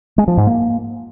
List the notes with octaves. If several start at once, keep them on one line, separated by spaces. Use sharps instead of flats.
G#3
F3
G#2
A#3